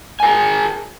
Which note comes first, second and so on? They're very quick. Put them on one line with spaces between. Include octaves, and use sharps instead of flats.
G#5 A#4 G#4